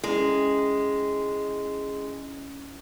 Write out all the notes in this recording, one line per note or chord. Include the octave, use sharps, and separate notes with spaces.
G#3 C#4 E4